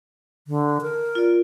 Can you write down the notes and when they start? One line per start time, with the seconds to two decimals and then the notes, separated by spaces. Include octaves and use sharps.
0.47 D3
0.81 A#4
1.15 F4 D5